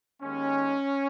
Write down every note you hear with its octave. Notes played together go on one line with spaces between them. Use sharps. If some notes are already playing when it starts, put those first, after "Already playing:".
D#2 D#3 G#3 C#4